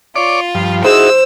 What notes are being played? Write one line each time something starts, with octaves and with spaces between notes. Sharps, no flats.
F4 C#5 D5 D6
G2 F3
D#4 E4 F#4 G#4 C5 E6